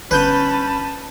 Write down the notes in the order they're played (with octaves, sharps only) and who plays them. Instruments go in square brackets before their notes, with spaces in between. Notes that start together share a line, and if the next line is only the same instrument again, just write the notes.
[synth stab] G1 G6 D#7 [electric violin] C#4 B5 [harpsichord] B4 [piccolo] A5